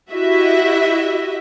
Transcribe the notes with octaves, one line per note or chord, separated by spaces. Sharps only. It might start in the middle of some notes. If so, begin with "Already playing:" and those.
E4 F#4 G4 D#5 E5